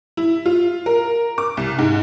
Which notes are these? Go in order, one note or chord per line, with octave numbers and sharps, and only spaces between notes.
E4
F4
A#4
D6
C2
G#2